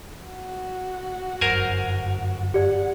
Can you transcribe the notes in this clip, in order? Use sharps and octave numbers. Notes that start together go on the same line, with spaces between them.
F#4
G1 F#2 A#4 C5 G#5
G4 D5 F#5